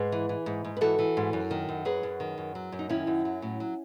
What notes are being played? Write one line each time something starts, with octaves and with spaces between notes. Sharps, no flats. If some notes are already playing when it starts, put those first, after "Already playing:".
Already playing: G#2 G#4 B4
E3
E3
G#2
G#2
B4
E3 F#4 A4
E3
G#2
F#2
D#3
F#2
F#3 G#4 B4
F#2
D#3
F#2
F#3
F#2
D#4
D#3 C#4 E4
F#2
F#3
A2
F#3